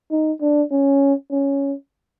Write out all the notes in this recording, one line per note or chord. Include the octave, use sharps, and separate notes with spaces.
D#4
D4
C#4
C#4